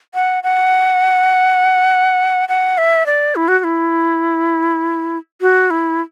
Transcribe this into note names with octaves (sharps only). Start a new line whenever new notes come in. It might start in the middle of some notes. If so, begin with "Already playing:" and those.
F#5
F#5
F#5
E5
D5
E4
F#4
F#4
E4
F#4
E4